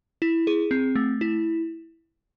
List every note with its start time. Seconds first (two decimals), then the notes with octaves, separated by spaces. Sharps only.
0.22 E4
0.47 G#4
0.71 C4
0.95 A3
1.21 E4